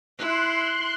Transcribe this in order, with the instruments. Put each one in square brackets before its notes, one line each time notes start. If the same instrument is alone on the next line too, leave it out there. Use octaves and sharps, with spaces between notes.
[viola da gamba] E4 [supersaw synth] C6 F#6